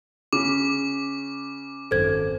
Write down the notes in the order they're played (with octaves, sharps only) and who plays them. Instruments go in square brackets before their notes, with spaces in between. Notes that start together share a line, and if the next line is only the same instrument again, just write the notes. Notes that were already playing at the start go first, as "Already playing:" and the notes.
[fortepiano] C#3 [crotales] D6
[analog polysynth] G#1 F#2 [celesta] A4 C5 G#6